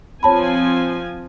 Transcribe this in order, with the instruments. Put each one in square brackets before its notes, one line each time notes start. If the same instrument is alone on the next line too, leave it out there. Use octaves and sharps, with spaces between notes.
[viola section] F3 C4 G#5 [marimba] C#5 A5 B5